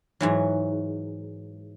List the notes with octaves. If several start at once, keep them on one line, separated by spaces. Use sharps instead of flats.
G#2 E3 F#3